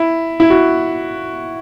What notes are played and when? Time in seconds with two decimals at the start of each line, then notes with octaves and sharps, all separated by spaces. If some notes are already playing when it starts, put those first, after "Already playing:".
Already playing: E4
0.40 E4
0.50 F#4